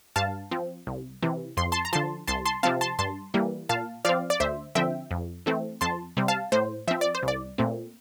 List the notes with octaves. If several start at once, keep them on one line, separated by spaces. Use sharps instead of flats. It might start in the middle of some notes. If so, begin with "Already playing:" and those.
G2 F5 A5
F3 C4
C2
C3 E3
F2 C6
A5 C6
A#5
D3 F3 A5 C6
C2 A5 C6
A5 C6
C3 F3 C4 F5 A5
A5 C6
G2 A5 C6
E3 G3 A#3
A#2 F5 A5
F3 C4 D5 F5
D5
D2 C5 E5
D3 F3 C4 E5 G5
F2
E3 A3 C4
F2 A5 C6
C3 G3 C4
F5 A5
A2 C5
F3 C4 E5
D5
C5
C2
D5
A#2 A3 C4